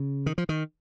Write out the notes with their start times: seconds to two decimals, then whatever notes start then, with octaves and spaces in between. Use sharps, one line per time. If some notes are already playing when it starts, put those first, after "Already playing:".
Already playing: C#3
0.26 D#3
0.38 F3
0.49 D#3